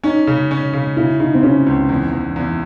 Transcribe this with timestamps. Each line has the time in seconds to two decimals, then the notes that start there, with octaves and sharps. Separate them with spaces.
0.04 C#4 D#4
0.27 C#3
0.51 C#4
0.73 C#3
0.97 C#3 E4
1.20 C#3 D#4
1.34 C4
1.43 C#3 C#4
1.66 C#2
1.89 E2
2.13 E2
2.36 E2